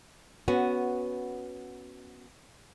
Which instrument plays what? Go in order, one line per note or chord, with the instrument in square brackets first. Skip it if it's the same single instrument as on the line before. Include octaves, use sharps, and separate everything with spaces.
[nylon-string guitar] B3 C#4 F#4